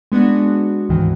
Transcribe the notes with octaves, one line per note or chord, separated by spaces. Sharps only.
G#3 B3 D4 F#4
D2 G#2 D#3 E3